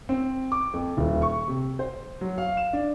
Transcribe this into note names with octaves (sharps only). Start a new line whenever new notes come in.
C4
D6
F2
D#1
C#6
C3
C5
F#3
F5
E7
D4